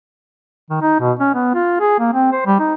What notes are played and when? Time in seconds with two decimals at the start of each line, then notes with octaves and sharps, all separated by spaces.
0.70 D#3
0.82 D#4
1.00 B2
1.19 C#4
1.34 B3
1.55 F4
1.80 G#4
1.99 A#3
2.13 C4
2.32 C5
2.46 G3
2.60 D#4